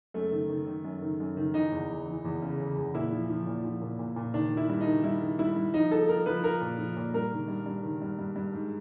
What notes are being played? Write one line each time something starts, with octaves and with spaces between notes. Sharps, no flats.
F#2 A3
D#3
D#3
D#3
F#2
D#3
F#2
D#3
E3 D#4
E2
E2
E3
E2
C#3
C#3
E2
A#2 E4
F3
F3
A#2
F3
A#2
A#2
A#2
D#3 D4
D#3
E4
G2
D#4
D#3
G2 E4
D#3
G2 E4
G2
F3 D#4
F3 A4
F3 A#4
F3 B4
F3 A#4
A#2
F3
A#2
G2 A#4
D#3
G2
G2
D#3
G2
G2
G2
G#2